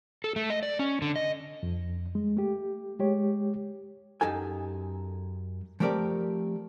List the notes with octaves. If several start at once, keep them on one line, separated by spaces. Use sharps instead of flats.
A4
A3
D#5
D5
C#4
D3
D#5
F2
G#3
A3 G4
G#3 G4 C#5
F#2 D#4 G4 A4 G#5
F3 A3 C4 G4 A#4 D5